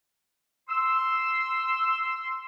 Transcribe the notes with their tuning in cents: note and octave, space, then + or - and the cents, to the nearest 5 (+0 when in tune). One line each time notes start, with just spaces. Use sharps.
C6 +0 E6 +0